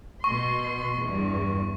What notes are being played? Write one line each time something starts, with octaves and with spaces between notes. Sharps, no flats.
B2 C6 C#6
E2 G2